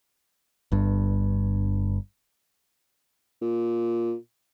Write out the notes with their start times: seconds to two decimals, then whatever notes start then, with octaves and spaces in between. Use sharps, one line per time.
0.72 G1 G2
3.42 A#2